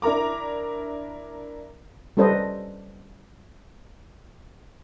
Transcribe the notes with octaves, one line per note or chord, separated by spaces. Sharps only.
D4 E4 A#4 A#5 D6
G3 C#4 A4 B4 C5 D#5